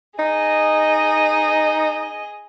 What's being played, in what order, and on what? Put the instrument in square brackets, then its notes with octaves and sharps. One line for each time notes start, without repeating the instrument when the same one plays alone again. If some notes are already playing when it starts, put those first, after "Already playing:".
[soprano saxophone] D#4 [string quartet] G#4 D#5